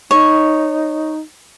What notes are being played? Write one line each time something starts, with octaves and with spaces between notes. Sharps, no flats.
D#4 C#5